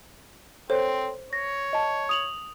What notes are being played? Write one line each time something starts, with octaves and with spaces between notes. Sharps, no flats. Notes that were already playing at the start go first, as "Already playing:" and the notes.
C4 A4 C5 C#5
C#5 A#6
D#5 A5
D#6 F7 F#7